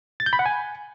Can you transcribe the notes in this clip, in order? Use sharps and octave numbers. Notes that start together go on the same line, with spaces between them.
A6
G6
B5
F#5
G#5